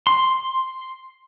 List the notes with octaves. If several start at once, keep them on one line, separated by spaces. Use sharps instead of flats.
C6